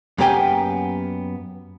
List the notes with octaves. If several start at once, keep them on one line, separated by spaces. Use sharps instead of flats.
F#2 A#3 B3 G4 G5 G#5